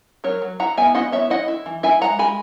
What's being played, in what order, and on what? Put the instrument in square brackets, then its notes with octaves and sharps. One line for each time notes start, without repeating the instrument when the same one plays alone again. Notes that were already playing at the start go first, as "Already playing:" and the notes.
[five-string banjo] F#3 A#4 C#5
F#3
E4 F#5 A#5
B3 E5 G#5
E4 D#5 F#5
B3 C#5 E5
E4 D#5 F#5
E4
E3
E4 E5 G#5
G#3 F#5 A#5
G#3 G#5 B5